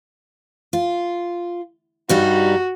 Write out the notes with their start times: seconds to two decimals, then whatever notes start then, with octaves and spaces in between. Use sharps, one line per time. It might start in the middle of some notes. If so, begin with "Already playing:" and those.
0.73 F4
2.09 G2 G3 D#4 F#4